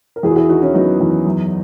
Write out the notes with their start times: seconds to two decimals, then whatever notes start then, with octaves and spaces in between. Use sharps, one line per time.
0.16 A#4
0.23 E2 E4 G#4
0.30 F#4
0.36 E4 G#4
0.49 D#3 D#4 F#4
0.62 C#4 E4
0.74 F#3 B3 D#4
1.00 E2
1.26 F#2